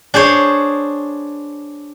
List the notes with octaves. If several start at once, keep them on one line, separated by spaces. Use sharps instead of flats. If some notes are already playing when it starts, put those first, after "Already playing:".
D4 G#4 C5 C#5